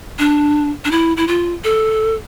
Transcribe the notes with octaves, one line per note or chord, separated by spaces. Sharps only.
D4
D4
E4
E4
F4
A4